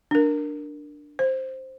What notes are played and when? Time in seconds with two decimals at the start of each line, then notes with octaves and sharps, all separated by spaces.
0.11 D4 A#4
1.19 C5